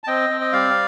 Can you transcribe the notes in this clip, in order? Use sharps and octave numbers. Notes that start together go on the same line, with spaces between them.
A5
C4 D#5 G5
C4
D#5
G3 D5 F5